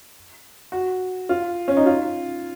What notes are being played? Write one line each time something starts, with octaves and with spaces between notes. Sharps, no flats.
F#4
F4
C#4
D#4
F4